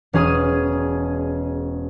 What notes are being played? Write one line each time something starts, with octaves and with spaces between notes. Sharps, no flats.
E1 C#4 G#4 D#6 D#7